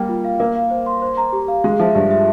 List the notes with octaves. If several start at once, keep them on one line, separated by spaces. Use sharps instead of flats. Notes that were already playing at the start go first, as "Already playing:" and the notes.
Already playing: G3 A#3 G5
F4
F5
A#3 A#4
F5
C5
C6
C5
A#5
G4
F5
G#3 G#4
F3 E5
G2 G4
E5